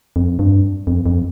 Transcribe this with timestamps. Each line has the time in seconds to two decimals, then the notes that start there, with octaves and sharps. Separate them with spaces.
0.16 F2
0.39 G2
0.87 F2
1.06 F2